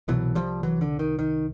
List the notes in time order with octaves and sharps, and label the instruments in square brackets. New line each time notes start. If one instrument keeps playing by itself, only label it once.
[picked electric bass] C2 B2 E3 F#3
F3 G3
E3 F#3
D3
D#3
D#3